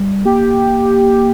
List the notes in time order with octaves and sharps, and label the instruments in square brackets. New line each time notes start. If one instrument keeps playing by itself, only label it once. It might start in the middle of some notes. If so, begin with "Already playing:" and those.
Already playing: [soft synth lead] G3
[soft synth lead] A#3 [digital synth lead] G4